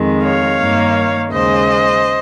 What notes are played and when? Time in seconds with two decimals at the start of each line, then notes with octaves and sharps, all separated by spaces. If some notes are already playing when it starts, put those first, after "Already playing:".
Already playing: F2 D#3 G#3
0.23 C#5 F5
0.59 G2 D#3 A#3
1.31 D#2 C#3 G#3 C5 D#5